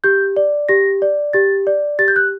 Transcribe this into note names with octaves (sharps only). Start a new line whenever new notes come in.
G4 G6
D5
G4 A#6
D5
G4 A6
D5
G4 A6
G6
F#6